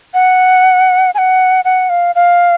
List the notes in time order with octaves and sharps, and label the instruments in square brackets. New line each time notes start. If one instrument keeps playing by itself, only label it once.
[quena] F#5
G#5
F#5
F#5
F5
F5